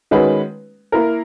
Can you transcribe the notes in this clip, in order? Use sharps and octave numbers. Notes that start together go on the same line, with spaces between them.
D#3 G#3 C#4 F#4 B4
A#3 E4 A#4